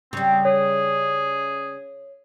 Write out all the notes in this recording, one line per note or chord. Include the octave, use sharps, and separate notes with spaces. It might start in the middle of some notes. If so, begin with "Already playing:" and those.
C#3 G3 C4
G#4 C#5